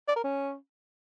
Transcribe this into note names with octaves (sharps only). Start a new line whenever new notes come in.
D5
A#4
C#4